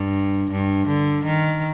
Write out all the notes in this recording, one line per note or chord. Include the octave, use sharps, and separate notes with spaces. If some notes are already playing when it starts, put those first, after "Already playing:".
Already playing: G2
G2
D3
D#3